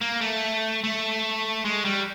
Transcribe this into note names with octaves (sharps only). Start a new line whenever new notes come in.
A#3
A3
A3
G#3
G3